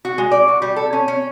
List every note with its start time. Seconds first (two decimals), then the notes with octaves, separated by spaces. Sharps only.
0.05 F#4
0.18 G#3
0.31 D5
0.48 F#4
0.62 G3
0.76 A4
0.93 C#4
1.08 C#4